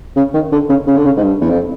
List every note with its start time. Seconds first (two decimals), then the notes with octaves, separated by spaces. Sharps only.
0.16 C#3
0.34 D#3
0.52 D3
0.69 C#3
0.87 C#3
0.97 D3
1.06 C#3
1.17 G#2
1.22 G2
1.41 E2
1.50 F2